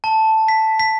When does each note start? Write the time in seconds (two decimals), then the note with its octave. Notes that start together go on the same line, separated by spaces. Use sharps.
0.04 A5
0.48 B6
0.80 B6